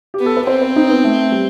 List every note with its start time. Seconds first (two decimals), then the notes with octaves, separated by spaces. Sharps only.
0.14 G4
0.20 B3
0.26 A4
0.37 B4
0.47 C4 C5
0.61 B4
0.76 D#4
0.90 B3
1.04 A3
1.32 G3